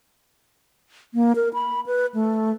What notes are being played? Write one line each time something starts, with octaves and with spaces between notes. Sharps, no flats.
A#3
A#4
B5
B4
A3